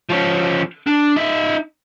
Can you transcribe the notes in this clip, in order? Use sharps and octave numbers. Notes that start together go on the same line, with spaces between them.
F3 C#4
D4
D#4 E5